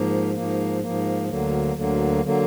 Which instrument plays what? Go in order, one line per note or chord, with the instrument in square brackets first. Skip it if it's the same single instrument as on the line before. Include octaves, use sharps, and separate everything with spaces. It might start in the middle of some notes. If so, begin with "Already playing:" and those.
Already playing: [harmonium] G#2 F3 A#3
G#2 F3 A#3
G#2 F3 A#3
D2 D3 F#3 A#3
D2 D3 F#3 A#3
D3 F#3 A#3